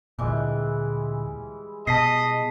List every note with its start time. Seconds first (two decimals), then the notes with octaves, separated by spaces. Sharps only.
0.19 D2 A#2 E3 G3 G#3
1.87 B2 D#5 A5 B6 C7